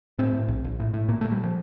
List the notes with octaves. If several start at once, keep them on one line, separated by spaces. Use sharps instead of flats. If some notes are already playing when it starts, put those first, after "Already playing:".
A2 C4
A2
A#1
A#1
A2
A2
A#2 A#3
A3
A#2
G3
F3